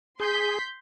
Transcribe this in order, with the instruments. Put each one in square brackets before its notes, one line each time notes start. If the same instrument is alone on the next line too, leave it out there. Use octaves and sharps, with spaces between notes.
[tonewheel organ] G#4 [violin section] C6 G6 B6